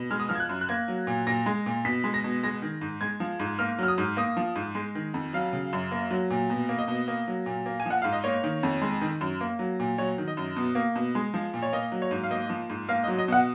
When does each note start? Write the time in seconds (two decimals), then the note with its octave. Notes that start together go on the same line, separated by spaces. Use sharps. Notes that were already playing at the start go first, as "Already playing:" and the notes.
Already playing: B2
0.11 G#3 F6
0.20 D#6
0.29 F3 F6
0.35 G#6
0.40 F#6
0.49 F#2
0.61 F#6
0.69 A#3 G#6
0.88 F#3
1.07 A#2
1.27 A#2 A#6
1.46 G#3
1.66 A#2
1.85 B2 B6
2.04 G#3
2.14 A#6
2.24 B2
2.43 G#3 A#6
2.62 D#3
2.81 G#2
3.01 G#3 G#6
3.20 F3
3.40 G#2
3.59 A#3 F6
3.79 F#3 F6
3.88 D#6
3.98 G#2
4.17 A#3 D#6
4.37 F3
4.56 G#2
4.75 G#3
4.95 D#3
5.14 F2
5.33 F#3 F5
5.53 C#3
5.73 F#2
5.91 A#3
6.11 F#3
6.30 A#2
6.50 B2
6.69 A#3
6.78 D#5
6.88 B2
7.08 A#3
7.27 F#3
7.46 A#2
7.66 A#3
7.80 G#5
7.86 F3 F#5
8.02 G#2 F5
8.13 D#5
8.24 A#3 C#5
8.44 D#3
8.63 F2
8.82 G#3
9.01 D#3
9.21 F#2
9.41 A#3
9.59 F#3
9.80 A#2
9.98 F#3 C#5
10.18 D#3
10.28 D#5
10.37 F#2
10.56 B2
10.75 A#3
10.95 B2
11.15 G#3
11.34 F3
11.54 A#2
11.62 C#5
11.73 A#3 D#5
11.92 F#3
12.02 C#5
12.11 G#2
12.23 F5
12.31 A#3 D#5
12.50 F3
12.70 G#2
12.89 A#3 F5
13.04 D#5
13.08 F#3
13.18 D#5
13.28 B2 F#5